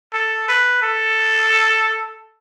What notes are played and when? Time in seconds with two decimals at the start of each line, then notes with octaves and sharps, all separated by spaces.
0.13 A4
0.48 B4
0.82 A4